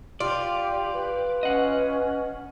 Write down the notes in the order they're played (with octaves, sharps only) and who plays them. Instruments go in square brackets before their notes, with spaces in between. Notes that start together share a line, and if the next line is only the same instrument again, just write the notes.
[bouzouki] F4 [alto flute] G4 [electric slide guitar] D5
[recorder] B4
[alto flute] C#4 [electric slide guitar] D#5 F#5